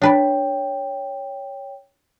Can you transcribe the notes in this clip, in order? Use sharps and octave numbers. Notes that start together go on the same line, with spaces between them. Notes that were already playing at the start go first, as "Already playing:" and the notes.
D4 B4 C#5 D5 G5